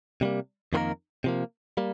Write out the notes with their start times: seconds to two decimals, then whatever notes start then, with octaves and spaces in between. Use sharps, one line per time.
0.21 C3 G3 A#3
0.73 F2 D#3 A#3 F4 A#4
1.24 C3 F3 A#3
1.77 G3 A#3